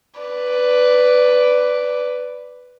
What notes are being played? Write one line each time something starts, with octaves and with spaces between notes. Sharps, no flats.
B4 D5